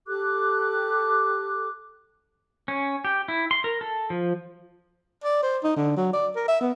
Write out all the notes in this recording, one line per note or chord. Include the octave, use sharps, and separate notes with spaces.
G4 A4 D6 F#6
C#4
G4
E4
C6
A#4
A4
F3
D5
C5
D#4
D3
F#3
D5
A#4
E5
B3